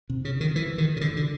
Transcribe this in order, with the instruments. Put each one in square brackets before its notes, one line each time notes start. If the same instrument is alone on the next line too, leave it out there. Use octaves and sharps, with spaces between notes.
[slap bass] C3
C#3
D#3
E3
D#3
C#3
D3
D3